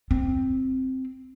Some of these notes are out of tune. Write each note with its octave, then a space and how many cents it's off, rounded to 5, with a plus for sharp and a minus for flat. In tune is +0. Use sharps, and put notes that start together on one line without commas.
C4 +0